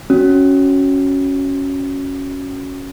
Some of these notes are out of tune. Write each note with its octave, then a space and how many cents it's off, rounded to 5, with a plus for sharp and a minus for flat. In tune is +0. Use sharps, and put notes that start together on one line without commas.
C#4 +0 F#4 +0